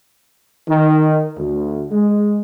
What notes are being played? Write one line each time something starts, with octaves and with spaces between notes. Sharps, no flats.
D#3
D2
G#3